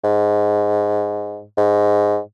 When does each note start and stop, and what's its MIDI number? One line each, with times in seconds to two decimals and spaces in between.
0.04 1.43 44
1.57 2.19 44